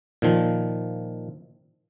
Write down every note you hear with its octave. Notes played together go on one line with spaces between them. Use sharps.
A#2 D#3 F3